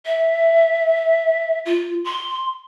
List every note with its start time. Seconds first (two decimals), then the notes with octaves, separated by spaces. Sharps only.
0.06 E5
1.65 F4
2.05 C6